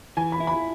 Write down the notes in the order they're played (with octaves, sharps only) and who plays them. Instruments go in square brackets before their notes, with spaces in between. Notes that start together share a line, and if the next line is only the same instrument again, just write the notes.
[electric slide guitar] E3 [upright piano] G#5
[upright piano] B5
[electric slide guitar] E4
[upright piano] B5